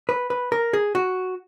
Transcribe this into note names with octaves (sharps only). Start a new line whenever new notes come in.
B4
B4
A#4
G#4
F#4